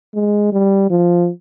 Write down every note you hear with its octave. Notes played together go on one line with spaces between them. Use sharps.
G#3
G3
F3